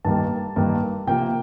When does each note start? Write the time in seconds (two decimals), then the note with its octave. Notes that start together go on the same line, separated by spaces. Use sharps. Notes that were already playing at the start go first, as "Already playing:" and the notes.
0.05 G2 D#3 G3 A#3 A5
0.56 G2 D#3 G3 A#3
1.07 C3 F3 A#3 G5